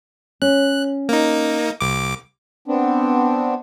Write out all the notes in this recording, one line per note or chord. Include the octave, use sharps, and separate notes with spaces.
C#4 F#6
A#3 D#4
C2 D6
B3 C4 D4